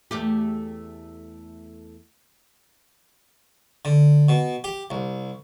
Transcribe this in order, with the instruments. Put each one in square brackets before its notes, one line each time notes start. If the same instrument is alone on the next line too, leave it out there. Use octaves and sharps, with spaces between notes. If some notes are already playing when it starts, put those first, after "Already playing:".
[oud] E2 A3 G4
[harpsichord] D3
B2
G4
C2